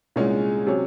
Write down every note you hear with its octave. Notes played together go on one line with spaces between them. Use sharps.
C2 A#2 G#3 C#4
C3 F#3 C#4